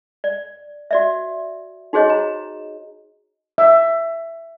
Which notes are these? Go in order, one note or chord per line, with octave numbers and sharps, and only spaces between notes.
D5
F#4 D5 E5
D#4 F#4 G#4 C5 C#5 D#5
A#5
E5